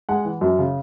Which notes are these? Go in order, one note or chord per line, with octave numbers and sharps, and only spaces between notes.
G#3 F#5
E3
F#2
C#3